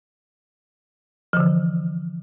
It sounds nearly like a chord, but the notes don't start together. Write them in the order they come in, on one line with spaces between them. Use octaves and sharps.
F3 D3 E3